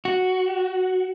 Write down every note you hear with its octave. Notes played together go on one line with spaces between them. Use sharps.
F#4